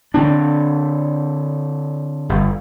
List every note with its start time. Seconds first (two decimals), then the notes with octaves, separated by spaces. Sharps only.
0.14 D3 C4 D4
2.29 G1